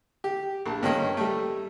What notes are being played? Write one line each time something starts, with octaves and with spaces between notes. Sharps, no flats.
G4
A#1 A5
G2 A#3 C#4 D#5 G5
G3 A3